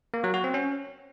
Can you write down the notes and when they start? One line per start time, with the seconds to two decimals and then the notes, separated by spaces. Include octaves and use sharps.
0.14 A#3
0.24 F#3
0.34 F#4
0.44 C4
0.54 C#4